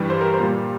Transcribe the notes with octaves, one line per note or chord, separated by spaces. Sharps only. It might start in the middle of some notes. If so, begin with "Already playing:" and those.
Already playing: G2 E3 G3
C5
A#4
C5
A#2 G3 A#3